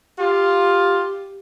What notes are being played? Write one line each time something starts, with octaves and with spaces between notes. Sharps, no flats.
F4 G4